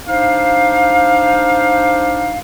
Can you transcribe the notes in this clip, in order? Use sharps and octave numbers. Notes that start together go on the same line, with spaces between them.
D4 D#4 C5 F5